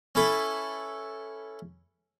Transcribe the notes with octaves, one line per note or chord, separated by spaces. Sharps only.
C#4 E4 A4 B4